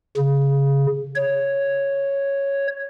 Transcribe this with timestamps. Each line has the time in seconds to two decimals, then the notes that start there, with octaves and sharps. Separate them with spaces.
0.17 C#3
1.16 C#5